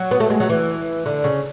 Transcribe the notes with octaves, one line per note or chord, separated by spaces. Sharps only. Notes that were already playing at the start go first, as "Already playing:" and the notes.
Already playing: F#3
B3
A3
G#3
F#3
E3
D3
C#3